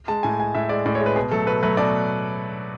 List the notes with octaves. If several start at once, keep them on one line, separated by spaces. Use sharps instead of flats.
G#3 A5
A2 G#5
G#3 G#5
A2 E5
G#3 D5
A2 D5
C#5
G#3
B4
B2 G#4
F#3 A3 A4
B2 B4
F#3 A3 B4
B2 D5